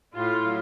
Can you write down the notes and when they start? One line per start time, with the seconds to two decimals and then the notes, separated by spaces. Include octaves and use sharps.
0.14 A2 F4
0.45 F#3